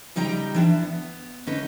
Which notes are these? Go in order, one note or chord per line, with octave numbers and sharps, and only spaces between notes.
C#3 G3 D#4 G5 A#5
E3 D4 E4
B3
D3 C#4 D#4 B4